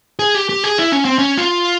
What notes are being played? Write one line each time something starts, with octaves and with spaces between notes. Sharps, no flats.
G#4
G4
G4
G#4
E4
C#4
C4
C#4
F4